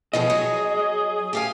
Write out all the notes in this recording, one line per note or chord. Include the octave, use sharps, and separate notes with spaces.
B2 D#3 F3 G#4 D#5
F#3
G4 F5 G#5